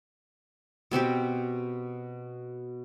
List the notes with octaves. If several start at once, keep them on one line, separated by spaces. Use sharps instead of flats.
B2 C4 F#4 G4